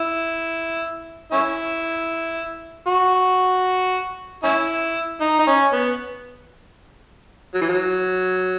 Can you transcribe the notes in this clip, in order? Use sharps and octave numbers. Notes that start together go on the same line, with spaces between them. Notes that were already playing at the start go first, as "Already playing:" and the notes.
Already playing: E4
C#4 E4
F#4
C#4 E4
D#4
D#4
C#4
B3
F#3
E3
F#3